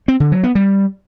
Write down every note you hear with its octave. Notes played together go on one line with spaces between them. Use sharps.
C4
D3
F#3
B3
G3